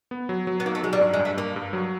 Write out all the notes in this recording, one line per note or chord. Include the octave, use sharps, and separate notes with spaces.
B3
F#3
F#3
B3
A#3 D#4
A3
F#3 G#3
G3
G2
G#3
G2
A3
G2 A#3
G2
F#3